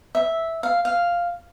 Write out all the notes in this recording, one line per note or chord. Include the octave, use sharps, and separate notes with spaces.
E5
F5
F5